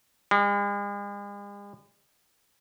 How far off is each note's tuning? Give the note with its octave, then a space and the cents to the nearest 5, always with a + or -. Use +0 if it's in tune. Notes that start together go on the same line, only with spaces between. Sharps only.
G#3 -45